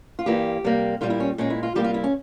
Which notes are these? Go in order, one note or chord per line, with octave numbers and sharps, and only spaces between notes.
F4
G2 E3 G3 A#3 G4
C3 G3 A#3
A#2 G3 A#3 F4
E4
C#4
A#2 G#3 C#4
E4
F4
C3 G3 A#3 G4
F4
E4
C#4